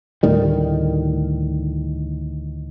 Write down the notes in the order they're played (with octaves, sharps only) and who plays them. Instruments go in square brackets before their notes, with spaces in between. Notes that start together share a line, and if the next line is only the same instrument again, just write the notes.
[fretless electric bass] D2 A2 D#3 G3